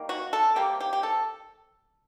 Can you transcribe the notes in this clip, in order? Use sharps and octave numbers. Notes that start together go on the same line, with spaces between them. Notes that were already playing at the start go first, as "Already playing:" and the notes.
Already playing: D#3 G3 A#3
F#4
A4
C3 G3 A#3 G4
G4
G4
A4